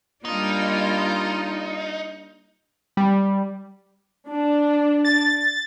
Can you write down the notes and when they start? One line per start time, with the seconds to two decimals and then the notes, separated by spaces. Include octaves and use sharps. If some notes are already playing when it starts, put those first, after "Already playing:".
0.25 G3 A#3 D4 D#4 F4
2.97 G3
4.28 D4
5.05 A6